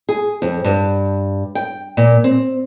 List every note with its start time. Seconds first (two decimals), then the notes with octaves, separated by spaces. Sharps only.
0.09 G#4
0.42 F2
0.64 G2
1.55 G5
1.97 A#2
2.24 C4